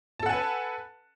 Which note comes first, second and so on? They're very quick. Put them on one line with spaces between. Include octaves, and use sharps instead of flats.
A5 A4 F#5 G#5 B4